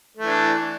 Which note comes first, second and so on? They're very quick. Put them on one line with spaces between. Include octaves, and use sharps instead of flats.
A3 E3 D4